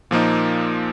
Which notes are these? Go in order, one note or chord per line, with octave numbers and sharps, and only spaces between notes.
A#2 F3 A#3 D#4